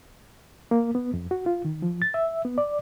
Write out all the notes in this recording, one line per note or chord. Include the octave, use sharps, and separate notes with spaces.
A#3
B3
F2
F#4
F4
D#3
F3
A6
E5
B3
D5